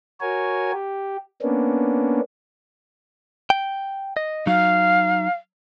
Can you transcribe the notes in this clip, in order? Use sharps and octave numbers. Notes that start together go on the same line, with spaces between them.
F#4 A#4 C#5 G#5
G4
A#3 B3 C#4 D4
G5
D#5
F#3 D#4 F5